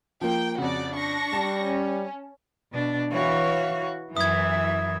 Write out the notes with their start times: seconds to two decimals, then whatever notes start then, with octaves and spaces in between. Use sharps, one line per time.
0.21 F3 A#3 G5
0.58 F2 C#3 F#4 D5
0.94 D4 C#6 A#6
1.33 G3 A5
1.66 C#4
2.72 B2 D4
3.12 E3 F#4 C#5 F5
4.17 F#2 E3 E5 D#6 G#6